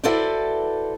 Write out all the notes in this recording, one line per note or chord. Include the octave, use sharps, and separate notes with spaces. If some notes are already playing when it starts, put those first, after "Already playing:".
E4 F#4 A4 B4 C5 D5